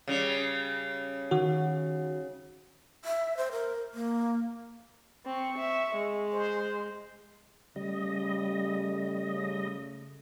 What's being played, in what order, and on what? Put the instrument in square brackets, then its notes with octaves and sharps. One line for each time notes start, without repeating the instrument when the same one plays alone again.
[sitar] C#3 G3
[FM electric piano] D#3 F#4
[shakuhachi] E5
C5
A#4
A#3
[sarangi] C4 [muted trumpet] C#6
[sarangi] E5
G#3
[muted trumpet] C5
[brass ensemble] C#3 A3 [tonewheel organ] G3 D#5